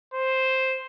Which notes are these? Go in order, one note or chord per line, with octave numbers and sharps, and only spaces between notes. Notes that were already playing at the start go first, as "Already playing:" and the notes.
C5